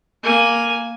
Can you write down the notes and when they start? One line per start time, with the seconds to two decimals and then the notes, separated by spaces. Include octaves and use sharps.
0.23 A#3 G#5